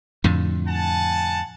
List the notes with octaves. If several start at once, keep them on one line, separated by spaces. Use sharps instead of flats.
F2 A2 D3
F#5 G#5 A5